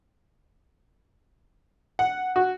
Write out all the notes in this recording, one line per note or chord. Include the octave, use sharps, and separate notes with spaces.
F#5
F#4